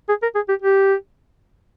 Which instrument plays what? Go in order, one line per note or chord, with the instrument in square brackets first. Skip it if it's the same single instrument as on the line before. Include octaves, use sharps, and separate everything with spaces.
[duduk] G#4
A#4
G#4
G4
G4